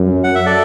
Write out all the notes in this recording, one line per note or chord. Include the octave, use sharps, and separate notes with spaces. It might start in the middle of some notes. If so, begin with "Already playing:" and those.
Already playing: F#2
F#5
E5
A4 D5